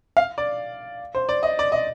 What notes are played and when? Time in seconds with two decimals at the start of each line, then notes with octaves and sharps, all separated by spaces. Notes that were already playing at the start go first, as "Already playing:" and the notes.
0.17 F5
0.38 D5
1.15 C5
1.29 D5
1.43 D#5
1.59 D5
1.72 D#5